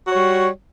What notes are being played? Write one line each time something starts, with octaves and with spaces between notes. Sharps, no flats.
G3 F#4 C#5